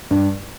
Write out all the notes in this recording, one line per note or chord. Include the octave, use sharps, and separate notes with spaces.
G2